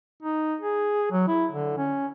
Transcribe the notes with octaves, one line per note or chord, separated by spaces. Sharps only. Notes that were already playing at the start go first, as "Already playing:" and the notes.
D#4
G#4
F#3
E4
D3
C#4